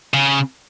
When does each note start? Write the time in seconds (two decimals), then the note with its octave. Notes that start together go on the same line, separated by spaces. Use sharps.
0.14 C#3